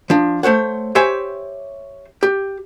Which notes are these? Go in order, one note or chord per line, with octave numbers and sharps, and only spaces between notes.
F3 D4
A3 C5 C#5 F#5
G4 C5 C#5 E5 G#5
G4